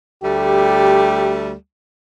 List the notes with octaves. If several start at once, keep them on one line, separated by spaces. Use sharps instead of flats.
D2 G3 A3 G4